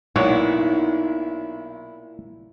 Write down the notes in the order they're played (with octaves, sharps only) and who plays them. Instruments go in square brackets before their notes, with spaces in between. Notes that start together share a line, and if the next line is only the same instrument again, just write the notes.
[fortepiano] B1 C#5 [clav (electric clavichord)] A#2 [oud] B3 D#4 [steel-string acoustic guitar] E4